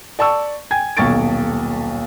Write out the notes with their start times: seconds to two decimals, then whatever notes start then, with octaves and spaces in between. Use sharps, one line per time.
0.19 D5 A5 C#6 E6
0.71 G5 G#5 G#6
0.97 D#1 B1 C#6 A6 D7